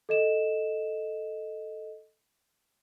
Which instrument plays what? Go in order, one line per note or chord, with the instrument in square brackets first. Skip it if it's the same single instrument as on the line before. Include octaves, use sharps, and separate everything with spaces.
[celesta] A4 D#5 E7